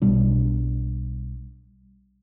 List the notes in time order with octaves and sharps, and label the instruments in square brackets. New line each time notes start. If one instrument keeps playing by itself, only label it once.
[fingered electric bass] B1 B2 G3 D4